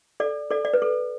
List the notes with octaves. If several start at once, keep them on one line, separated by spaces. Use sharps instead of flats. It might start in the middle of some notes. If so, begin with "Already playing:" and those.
A4 D5
A4 D5
D5
B4
A4